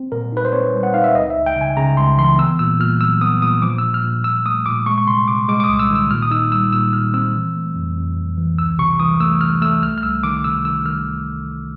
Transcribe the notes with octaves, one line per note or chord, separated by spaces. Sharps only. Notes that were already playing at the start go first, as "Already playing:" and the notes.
Already playing: C4
A#2 A#4
D#4 B4
C5
C4 C#5
G3
F#5
D#4 F5
E5
C#2 D#5
E5
C#2
G5
C#3
G#5
C#3 A#5
C#2 C6
E3 C6
B3 E6
A#2 E6
A#2 F6
F#3 E6
B3 D#6
A#2 D#6
F3 D6
E6
A#2
F6
A#2
A#2 E6
A3 D#6
A#2 D6
G#3 C#6
C#6
C3 C6
C3 D6
G#3 D6
D6
D#6
C2
E6
D#3
E6
A#2 F6
D#6
D#4 E6
G3 E6
A#2 E6
A#2 F6
C4 E6
E3
A3
F2
F2
F2
E3
C#2 E6
C3 C#6
E3 D#6
A3 E6
C3 F6
A3 E6
C2 F6
F6
C2 E6
D#3 D6
C3 E6
D#3 E6
D#3 F6